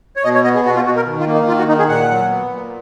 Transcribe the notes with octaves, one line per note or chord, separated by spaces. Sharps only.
C#5
B2 D#5
C#5
B3 D#5
G#4
B2 F#4
F4
B2 F#4
A#4
D#3
F4
A#3
D#4
D#3 F4
F#4
D#3 D#4
G#4
A#2 F#5
F#3
B3
A#2